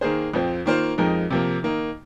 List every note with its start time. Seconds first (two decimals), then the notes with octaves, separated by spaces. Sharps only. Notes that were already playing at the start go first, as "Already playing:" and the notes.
0.01 D#3 A#3 G#4 C5
0.34 F2 F3 C4
0.66 D#3 A#3 F4 C5
0.98 F2 F3 G#3 D#4 A#4
1.30 C3 F3 A#3
1.63 D#3 A#3 D#4